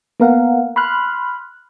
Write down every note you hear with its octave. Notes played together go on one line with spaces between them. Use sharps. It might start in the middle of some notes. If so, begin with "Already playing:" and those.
A#3 B3 A#4 F5 F#5
B5 C6 F6 F#6